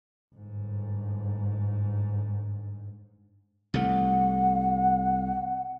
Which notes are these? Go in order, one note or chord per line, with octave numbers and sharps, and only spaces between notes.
G1 G#2
C2 C3 A3 F#5